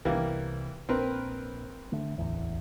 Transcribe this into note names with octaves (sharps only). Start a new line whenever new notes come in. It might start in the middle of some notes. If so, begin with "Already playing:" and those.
C2 E3 G3 A#3
A#1 C4 A#4 B4
D3 A3 D4
D1 A1 E2